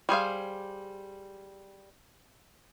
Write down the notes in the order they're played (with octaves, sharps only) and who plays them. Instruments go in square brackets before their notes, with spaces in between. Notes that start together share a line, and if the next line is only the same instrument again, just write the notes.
[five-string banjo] G3 G#4 C5 F5